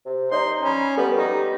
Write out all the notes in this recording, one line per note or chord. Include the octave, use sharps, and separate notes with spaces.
C3
D#4 C#5 D5 A#5 C6
C#4 A#5 B5
G3 B3 A4 B4
D#4 G4 A#5